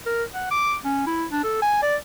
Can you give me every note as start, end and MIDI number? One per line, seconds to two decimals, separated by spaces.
0.06 0.23 70
0.34 0.48 78
0.51 0.75 86
0.85 1.02 61
1.07 1.25 64
1.31 1.43 62
1.44 1.59 69
1.62 1.80 80
1.83 1.96 74